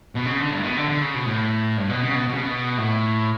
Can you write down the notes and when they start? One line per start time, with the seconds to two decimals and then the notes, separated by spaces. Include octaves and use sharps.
0.15 B2
0.25 C#3
0.38 D3
0.51 G2
0.58 A2
0.63 B2
0.76 D3
0.89 D3
1.01 C#3
1.15 B2
1.26 A2
1.77 G2
1.89 B2
2.03 C#3
2.16 B2
2.28 B2
2.35 C#3
2.42 B2
2.78 A2